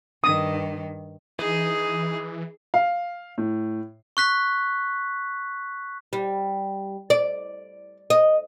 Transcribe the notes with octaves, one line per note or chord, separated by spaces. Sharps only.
G2 D#3 D#6
E3 D#4 G#4
F5
A2
C#6 F#6 B6
G3
D5
D#5